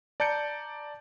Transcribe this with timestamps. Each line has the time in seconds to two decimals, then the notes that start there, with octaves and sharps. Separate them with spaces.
0.20 D5 A5 A#5 G6 C#7 D7